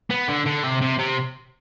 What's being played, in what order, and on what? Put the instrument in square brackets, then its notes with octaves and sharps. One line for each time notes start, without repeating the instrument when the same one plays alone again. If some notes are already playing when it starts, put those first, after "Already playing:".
[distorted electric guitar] B3
D3
D3
C3
C3
C3